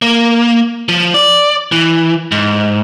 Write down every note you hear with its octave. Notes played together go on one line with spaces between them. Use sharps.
A#3
F3
D5
E3
G#2